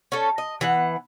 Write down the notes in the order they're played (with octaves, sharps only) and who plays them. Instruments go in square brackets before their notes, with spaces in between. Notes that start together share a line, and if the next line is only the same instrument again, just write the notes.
[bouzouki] C#4 A4
D#5
E3 B3 F#5